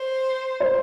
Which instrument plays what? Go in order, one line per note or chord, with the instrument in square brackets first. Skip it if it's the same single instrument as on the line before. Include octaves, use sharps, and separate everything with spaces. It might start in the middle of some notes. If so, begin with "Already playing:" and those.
Already playing: [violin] C5
[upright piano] C5